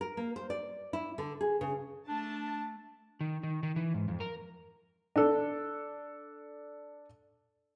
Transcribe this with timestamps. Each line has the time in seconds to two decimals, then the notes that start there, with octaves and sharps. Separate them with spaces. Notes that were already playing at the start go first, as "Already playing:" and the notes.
0.01 A#4
0.17 A#3
0.36 C5
0.50 D5
0.93 E4
1.18 D3
1.41 G#4
1.61 C#3
2.08 A3 D4 A5
3.21 D#3
3.43 D#3
3.63 D#3
3.76 E3
3.94 G#2
4.08 F2
4.20 A#4
5.16 D4 A4